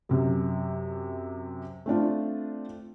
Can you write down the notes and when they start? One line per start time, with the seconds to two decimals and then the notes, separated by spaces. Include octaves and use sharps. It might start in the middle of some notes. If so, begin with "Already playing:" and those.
0.09 F#2 C3
1.86 A3 C4 D4 F4